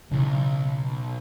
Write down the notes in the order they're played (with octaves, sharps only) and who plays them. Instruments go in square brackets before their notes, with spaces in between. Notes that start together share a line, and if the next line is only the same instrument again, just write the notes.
[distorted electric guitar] B1 [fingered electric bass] C#3 E3